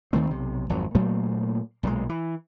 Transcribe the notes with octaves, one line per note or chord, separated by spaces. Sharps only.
D#2 D#3 A3 C4
B1 C3
G#1 F2 F#3
A#2 F#3 A3 A#3
B1 A#2 F3 G#3
E3